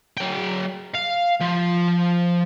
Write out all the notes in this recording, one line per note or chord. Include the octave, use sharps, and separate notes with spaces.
F#3 G5
F5
F3